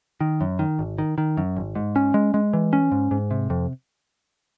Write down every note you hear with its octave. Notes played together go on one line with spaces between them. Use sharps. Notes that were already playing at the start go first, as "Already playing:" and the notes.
D#3
F#2
D#3
G#1
D#3
D#3
F#2
G#1
G#2
C#4
G#3
G#3
E3
C#4
G#2
G#2
C3
F2